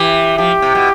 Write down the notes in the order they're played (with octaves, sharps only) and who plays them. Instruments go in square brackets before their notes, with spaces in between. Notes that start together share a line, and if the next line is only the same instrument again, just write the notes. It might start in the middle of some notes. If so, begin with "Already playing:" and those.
Already playing: [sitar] E3 [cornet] G4
[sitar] F3 [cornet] G4
[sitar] C3
B2